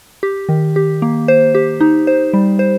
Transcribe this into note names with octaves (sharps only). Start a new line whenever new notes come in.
G4
D#3
G4
A#3
C5
G4
D#4
C5
G3
C5